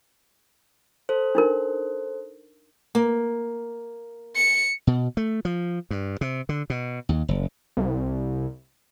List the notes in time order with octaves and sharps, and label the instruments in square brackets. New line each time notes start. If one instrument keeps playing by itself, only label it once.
[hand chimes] A4 C5
[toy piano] D4 D#4 A#4
[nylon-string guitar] A#3
[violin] C#7
[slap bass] B2
A3
F3
G2
C3
D3
B2
D#2
F#1
[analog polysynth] C2